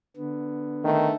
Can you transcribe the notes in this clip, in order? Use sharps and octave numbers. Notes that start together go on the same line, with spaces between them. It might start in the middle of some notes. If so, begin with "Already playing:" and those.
D3 B3
D#3 A3